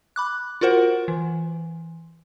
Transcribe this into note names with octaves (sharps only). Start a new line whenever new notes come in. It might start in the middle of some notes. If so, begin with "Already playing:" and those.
B5 D6 F#6
F4 F#4 A#4 C5 F#5
E3